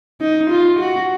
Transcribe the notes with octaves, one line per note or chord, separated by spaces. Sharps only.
D#4
F4
F#4